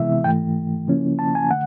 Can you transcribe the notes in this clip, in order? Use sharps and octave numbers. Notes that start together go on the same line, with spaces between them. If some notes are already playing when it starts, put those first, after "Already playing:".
Already playing: C3 E3 G#3 B3 E4 E5
G#2 E3 A3 G5
C#3 F3 A#3 C#4 E4
A5
G#5
D3 A3 F#5